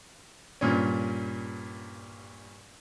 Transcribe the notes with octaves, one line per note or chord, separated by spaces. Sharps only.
G2 A#2 C#4